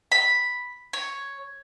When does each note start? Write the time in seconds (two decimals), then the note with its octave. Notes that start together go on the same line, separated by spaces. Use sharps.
0.12 B5
0.93 C#5